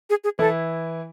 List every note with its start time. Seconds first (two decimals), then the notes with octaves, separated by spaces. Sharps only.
0.10 G#4
0.24 G#4
0.39 E3 E4 A4